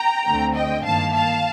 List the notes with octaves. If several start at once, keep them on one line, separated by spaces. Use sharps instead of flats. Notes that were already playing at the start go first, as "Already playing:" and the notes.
Already playing: G5 A#5
D2 D3 A3 C4
D#5 G5
G2 D#3 A#3 F5 A5
F5 A5